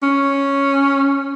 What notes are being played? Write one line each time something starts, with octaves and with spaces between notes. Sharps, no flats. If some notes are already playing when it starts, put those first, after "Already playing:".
C#4